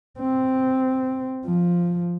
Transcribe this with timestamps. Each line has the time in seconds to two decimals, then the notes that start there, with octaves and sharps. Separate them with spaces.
0.19 C4
1.46 F3